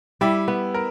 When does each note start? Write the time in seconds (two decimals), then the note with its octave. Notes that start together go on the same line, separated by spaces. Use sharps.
0.21 G3 E4
0.48 B3
0.74 A#4